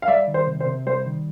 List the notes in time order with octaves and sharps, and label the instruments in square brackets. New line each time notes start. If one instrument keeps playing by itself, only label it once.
[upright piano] F5
[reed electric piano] G3 [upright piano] D5 E5
[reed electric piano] D#3
[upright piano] C5
[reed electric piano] C3
[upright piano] C5
[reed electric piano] C3
[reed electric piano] G3 [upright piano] C5
[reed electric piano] D#3